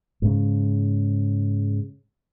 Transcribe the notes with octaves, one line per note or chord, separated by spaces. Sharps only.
G#2 C#3